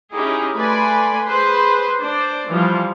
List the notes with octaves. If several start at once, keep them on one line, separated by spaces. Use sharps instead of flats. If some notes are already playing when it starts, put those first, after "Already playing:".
C#4 D#4 E4 G4 G#4
A3 B4 D5 G#5 B5 C6
G#4 B4 C5 C6
D4 C5 D5
E3 F3 G3